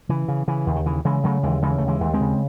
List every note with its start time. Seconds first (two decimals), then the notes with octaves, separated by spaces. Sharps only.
0.09 C#3 E3
0.28 C#3
0.48 C#3 E3
0.67 D#2
0.76 D#3
0.86 C#3 E3
1.05 C#3 E3 G#3
1.24 C#3 F#3 A3
1.43 D#2 E3 G#3
1.62 C#3 E3 G#3
1.78 D#2 A3
1.88 E3 G#3
2.01 D#2
2.14 G#3 C4
2.21 C#3